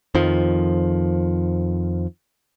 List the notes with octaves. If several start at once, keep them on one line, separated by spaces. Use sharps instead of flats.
F2 D#3 F3